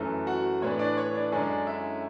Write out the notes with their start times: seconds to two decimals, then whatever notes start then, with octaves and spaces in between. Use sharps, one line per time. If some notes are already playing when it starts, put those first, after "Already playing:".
Already playing: F#2 E3 A3
0.27 F#4 F#5
0.62 A2 E3 B3 D4 C#5
0.79 D4 D5
0.97 C#5
1.15 D4 D5
1.32 F#2 D3 G#3 C#4 D4 D5
1.67 E4 E5